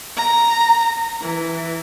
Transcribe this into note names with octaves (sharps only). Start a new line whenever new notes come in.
A#5
E3